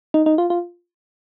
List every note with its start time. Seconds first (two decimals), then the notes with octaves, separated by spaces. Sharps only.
0.14 D#4
0.26 D#4
0.38 F4
0.50 F4